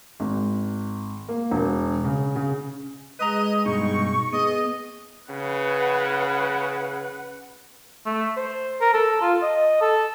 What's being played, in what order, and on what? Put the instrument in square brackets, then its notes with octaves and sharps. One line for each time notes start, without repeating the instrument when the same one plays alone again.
[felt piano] G#1
A#3
E1
C#3
C#3
[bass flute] G#3 [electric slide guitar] B4 A#5 [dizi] D#5
[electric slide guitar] G2 B2 D#4 [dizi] C#6
[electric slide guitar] B3 [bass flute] G#4 [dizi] D#5
[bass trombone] C#3 [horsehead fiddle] B4 F#5
[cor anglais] A3
C5
A#4
A4
F4
D#5
A4